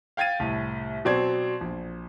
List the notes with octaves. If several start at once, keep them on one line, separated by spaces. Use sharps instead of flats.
F5 G5 G#6 A6 D#7
C2 A2
B2 F#3 C4 D5 C6 G#6
A#1